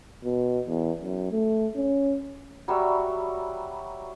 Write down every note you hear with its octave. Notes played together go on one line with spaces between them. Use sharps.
B2
E2
F#2
A3
C#4
F#3 G3 C#5 E5